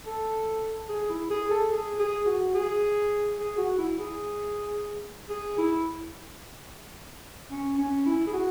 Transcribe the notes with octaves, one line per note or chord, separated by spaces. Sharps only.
A4
G#4
E4
G#4
A4
G#4
G#4
F#4
G#4
G#4
F#4
E4
G#4
G#4
E4
C#4
C#4
E4
G#4
F#4